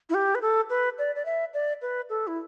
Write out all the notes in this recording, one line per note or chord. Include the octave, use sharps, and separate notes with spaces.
E4
G4
B4
A4
B4
D5
D5
E5
D5
B4
A4
E4